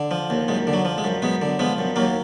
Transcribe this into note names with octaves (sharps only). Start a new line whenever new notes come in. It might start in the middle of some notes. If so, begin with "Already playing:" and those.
Already playing: D3
F3
D#2
F#2 G#3
D3
F#3
F3
G#3
F#2
F#2 G#3 B3
D3
F3 G#3 B3
F#2
D#2 F#3 A#3